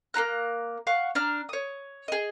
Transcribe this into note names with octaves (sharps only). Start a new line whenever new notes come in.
A#3 F4 A#5 F#6
F5 F#5 C#6
D4 A#5 F6
C#5 D#6
G#4 D#5